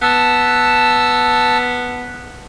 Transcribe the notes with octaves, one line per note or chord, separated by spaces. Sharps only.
B3 A5 E6